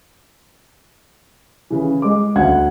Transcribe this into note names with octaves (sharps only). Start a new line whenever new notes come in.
C#3 E3
G#3 D6
D2 F#5 G#6